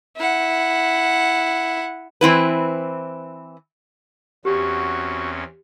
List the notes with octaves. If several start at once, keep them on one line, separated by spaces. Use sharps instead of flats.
E4 F#5
E3 C4 E4 B4
E2 C4 C#4 F#4 G4